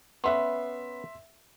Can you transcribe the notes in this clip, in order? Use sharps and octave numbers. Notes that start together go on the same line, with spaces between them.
B3 C#4 B4 E5 C6